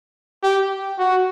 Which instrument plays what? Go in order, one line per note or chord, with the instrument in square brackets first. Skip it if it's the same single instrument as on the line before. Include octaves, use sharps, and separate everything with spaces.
[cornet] G4
F#4